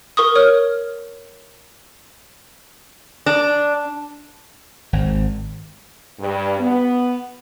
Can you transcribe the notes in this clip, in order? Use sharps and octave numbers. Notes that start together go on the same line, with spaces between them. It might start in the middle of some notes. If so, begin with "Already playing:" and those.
A#4 C#6 D#6
C#5 F6
D4
G#1
G2
B3